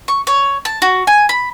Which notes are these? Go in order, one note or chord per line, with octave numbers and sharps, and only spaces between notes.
C#6
C#5
A5
F#4
G#5
B5